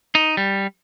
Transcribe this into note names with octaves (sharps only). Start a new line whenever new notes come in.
D#4
G3